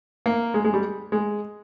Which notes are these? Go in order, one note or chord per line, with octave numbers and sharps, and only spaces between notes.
A#3
G#3
G#3
G3
G#3